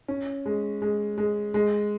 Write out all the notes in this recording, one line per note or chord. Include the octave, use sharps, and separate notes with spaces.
C#4
G#3
G#3
G#3
G#3